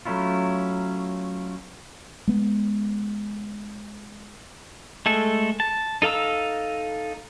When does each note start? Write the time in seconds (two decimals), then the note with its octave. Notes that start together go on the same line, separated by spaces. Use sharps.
0.05 F#3 A3 C#4 E4 F4
2.27 G#3 B3
5.06 G#3 A3 A4
5.60 A5
6.02 D#4 A4 F5 A#5 E6